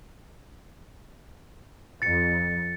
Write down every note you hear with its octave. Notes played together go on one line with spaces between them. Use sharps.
F2 A6 C#7